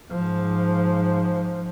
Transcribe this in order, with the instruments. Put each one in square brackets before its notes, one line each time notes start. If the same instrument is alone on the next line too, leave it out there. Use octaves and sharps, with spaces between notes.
[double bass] G#2 F3